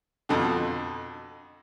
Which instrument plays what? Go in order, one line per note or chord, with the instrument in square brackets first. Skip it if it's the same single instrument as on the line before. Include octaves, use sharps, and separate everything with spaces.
[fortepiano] F2 B2 D3